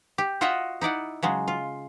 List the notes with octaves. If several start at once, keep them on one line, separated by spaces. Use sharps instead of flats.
G4
F4 F#4 C#5 D#5 E5 F#5
D#4 E4 D5 F#5
C#3 F#3 G#3
F4